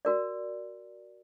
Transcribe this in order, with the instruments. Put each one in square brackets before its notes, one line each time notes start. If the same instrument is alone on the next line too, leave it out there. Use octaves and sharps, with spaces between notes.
[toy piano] F#4 A#4 D5